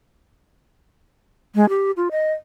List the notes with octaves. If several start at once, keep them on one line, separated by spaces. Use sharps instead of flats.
G#3
G4
F4
D#5